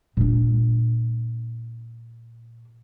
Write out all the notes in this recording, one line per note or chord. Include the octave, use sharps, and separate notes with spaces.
A#2 D4